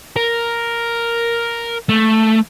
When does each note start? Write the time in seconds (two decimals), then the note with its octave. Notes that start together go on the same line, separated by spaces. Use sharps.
0.16 A#4
1.89 A3